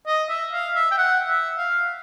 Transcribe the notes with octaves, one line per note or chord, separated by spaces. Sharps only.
D#5
E5
F5
E5
G5
F#5
E5
F5